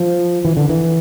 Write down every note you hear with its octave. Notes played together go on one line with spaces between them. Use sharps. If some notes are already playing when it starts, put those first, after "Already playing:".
Already playing: F3
E3
D3
E3